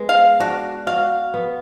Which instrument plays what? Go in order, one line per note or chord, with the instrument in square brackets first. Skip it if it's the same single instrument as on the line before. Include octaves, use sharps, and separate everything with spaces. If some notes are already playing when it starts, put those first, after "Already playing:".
Already playing: [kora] G#3 B3
[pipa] F5
[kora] D4 [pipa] F#4
[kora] F#4 [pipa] F5
[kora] B3